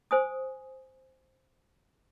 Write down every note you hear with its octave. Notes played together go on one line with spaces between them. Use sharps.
C5 G#5 D#6